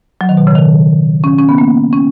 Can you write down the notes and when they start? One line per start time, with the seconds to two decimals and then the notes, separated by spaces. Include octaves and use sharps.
0.21 F#3
0.29 D#3
0.37 B2
0.47 C#3
0.56 D#3
1.24 C#4
1.39 C#4
1.49 B3
1.58 A#3
1.93 C#4